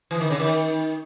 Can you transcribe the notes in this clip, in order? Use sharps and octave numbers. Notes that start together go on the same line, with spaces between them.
E3
D#3
C#3
D#3